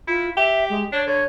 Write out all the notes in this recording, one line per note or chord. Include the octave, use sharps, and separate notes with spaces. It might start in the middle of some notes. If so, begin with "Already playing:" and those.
E4 F4
G4 E5
G#3
D4 C#5
D3 C#5